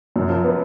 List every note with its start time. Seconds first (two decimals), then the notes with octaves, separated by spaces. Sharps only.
0.16 F#2
0.29 F3
0.44 B3